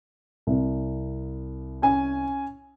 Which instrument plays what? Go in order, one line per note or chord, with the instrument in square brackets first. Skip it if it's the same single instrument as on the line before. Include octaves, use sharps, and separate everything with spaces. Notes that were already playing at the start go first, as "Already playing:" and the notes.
[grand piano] C2
[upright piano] C#4 G#5